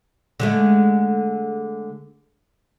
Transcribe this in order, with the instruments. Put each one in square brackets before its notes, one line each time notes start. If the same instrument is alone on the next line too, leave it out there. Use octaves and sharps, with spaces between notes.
[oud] D3 G#3 A3